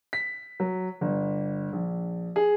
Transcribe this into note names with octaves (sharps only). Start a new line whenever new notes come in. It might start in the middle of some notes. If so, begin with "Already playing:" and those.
B6
F#3
G1
A#1
G#4